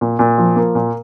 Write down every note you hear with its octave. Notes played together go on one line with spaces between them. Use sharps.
A#2
A#2
F3
A#3
A#2